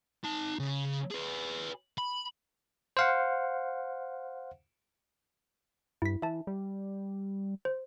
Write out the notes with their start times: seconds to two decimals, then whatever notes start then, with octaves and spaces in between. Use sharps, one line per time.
0.24 D#4 A5
0.59 C#3
1.11 G#4 B4
1.98 B5
2.97 C5 F5 F#5
6.02 G2 E4 B6
6.22 E3 E5 A5
6.47 G3
7.65 C5